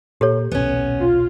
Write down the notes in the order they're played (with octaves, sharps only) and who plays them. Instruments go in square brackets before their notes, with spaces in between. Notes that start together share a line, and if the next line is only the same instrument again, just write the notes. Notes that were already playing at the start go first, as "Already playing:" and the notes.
[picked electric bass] A#2 [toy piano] G4 A4 C#5
[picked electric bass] D#1 B1 [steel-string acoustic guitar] B3 C#4
[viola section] F4